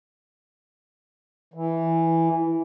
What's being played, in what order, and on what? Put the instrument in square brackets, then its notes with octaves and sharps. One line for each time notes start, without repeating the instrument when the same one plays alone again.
[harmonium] E3